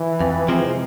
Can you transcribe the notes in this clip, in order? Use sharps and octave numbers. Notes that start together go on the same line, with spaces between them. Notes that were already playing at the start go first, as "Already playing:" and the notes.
Already playing: E3
F2
C3 F3 G#3 C4